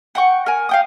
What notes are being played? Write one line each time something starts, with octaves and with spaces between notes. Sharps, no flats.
F#5 G5 C#6
A#4 G#5
F5 G5 D#6